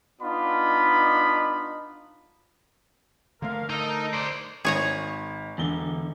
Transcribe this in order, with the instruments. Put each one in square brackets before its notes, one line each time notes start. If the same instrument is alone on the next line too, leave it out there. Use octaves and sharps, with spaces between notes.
[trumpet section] B3 D4 D#4 F4 D#5 B5
[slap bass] D3 A3 [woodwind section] A#4 F5
[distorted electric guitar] D#4 [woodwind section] A4 A#4 D#5
[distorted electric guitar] C5 D5
[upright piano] G#1 [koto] G#4 C#5 A#5
[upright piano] E1 G7 [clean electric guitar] E2 D3